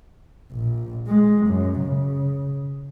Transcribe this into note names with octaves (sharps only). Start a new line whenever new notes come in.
A#1
G#3
F#2
C#3